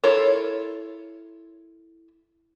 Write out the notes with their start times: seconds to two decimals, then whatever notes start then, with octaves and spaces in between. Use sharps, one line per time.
0.04 E4 F4 A4 A#4 C#5